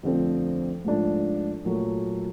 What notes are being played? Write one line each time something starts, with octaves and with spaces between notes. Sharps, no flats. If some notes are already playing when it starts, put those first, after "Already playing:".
F2 D3 F3 A3 C4
G#2 F3 A3 D4
A#2 F#3 A3